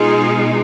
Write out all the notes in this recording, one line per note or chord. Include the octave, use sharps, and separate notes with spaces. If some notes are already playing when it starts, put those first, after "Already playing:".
Already playing: B2 G#3 D#4 F4 G#4